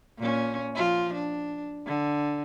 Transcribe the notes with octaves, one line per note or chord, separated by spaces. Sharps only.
A#2 C#4
F3 F4
D4
D3